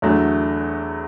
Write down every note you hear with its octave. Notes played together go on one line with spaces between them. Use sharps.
E2 D3 F#3 A3